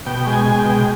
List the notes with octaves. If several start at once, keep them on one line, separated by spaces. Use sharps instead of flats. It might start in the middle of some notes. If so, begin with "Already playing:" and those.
B2 G5
G#3
G#5
G#3
G5
B2